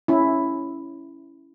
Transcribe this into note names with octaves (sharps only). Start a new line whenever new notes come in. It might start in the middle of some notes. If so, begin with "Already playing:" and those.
C#4 E4